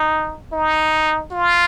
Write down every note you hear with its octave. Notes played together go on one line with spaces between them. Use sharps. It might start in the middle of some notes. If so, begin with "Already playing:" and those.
Already playing: D#4
D#4
F4